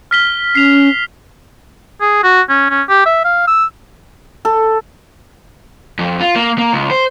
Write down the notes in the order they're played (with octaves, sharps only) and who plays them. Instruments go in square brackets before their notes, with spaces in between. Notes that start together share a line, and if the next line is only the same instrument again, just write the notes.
[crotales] F6 B6 G7
[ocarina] C#4 [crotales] C7 F7
[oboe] G#4
F#4
C#4
C#4
G4
E5
F5
E6
[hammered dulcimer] A4
[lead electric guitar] F2
F4
A#3
A#3
C#2
C5